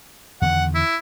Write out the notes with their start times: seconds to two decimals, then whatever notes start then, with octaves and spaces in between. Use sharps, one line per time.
0.42 E2 D3 D#3 F#5
0.75 E4